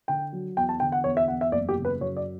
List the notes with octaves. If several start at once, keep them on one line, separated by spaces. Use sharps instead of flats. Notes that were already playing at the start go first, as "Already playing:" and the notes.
D3 G5
F#3
E2 G5
A5
D3 G5
F#5
E2 C#5
E5
E2 F#5
E5
F#1 D5
G4
C#3
B4
F#2 C#5
D5